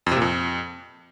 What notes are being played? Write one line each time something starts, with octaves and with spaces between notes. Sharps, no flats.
F2
C3
A#2
F2